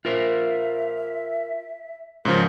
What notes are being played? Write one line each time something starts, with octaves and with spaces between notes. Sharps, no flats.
F4 A#4 C5 E5
G#2 C#3 F3 A#4